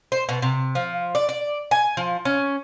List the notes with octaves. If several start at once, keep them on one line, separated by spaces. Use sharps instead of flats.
C5
B2
C3
F3
D5
D5
G#5
F3
C#4